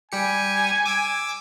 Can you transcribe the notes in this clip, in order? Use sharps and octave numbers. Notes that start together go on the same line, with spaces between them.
G3 G4 G#5 C#7
D6 E6 G#6